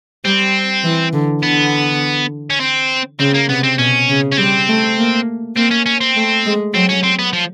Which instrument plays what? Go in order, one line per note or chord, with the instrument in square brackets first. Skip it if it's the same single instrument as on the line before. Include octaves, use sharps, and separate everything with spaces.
[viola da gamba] G3 [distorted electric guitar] C4
[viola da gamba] E3
D3
[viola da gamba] D3 [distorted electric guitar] B3
[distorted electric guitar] C#4
C4
[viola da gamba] C#3 [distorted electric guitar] C4
[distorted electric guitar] A#3
[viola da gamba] C3 [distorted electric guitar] B3
[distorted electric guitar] C4
[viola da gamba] B2 [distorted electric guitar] C#4
[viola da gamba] C#3
[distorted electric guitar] C#4
[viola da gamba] G3 [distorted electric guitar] C4
[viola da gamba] A3
A#3
[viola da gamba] A#3 [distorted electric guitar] C4
[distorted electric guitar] C#4
C#4
C4
[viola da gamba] A3
G#3
[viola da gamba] F#3 [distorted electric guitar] C4
[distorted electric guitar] C#4
C4
B3
F3